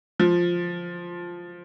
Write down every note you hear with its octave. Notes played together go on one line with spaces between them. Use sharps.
F3